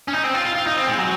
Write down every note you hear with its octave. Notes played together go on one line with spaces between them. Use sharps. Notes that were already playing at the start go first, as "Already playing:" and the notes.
C#4
D#4
C4
F4
F4
F4
D#4
C4
G#3
F#3